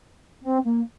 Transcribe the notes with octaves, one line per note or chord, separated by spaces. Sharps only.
C4
A#3